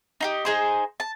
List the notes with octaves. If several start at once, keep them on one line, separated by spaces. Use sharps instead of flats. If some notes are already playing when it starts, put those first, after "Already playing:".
D#4 F4 G4
D#4 G#4 C5
A5